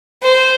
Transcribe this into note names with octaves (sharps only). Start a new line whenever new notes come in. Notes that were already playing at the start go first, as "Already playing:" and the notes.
C5